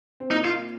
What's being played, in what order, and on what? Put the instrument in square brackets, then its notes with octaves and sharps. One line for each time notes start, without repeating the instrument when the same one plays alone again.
[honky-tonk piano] C4
[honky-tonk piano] A#2 A#3 [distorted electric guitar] D#4
[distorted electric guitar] F4